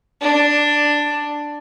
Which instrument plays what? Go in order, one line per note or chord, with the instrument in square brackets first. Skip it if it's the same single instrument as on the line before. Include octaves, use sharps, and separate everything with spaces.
[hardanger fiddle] D4